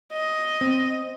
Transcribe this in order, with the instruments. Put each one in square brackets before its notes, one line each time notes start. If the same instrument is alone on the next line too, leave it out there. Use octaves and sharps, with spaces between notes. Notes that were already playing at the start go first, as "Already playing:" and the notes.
[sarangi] D#5
[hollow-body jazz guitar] C4